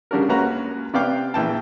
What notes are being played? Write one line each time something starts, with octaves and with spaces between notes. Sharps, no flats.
C#3 G3 D4 F#4 A#4
C#2 A#3 C#4 F#4 B4 A#5
C3 B3 D5 F5 G5 D6
A#1 E3 G5 A5